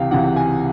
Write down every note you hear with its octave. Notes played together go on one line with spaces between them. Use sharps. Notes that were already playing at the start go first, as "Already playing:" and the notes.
Already playing: C#2 C3 E3 F5 G5
C#2 C3 E3 F#5
G#5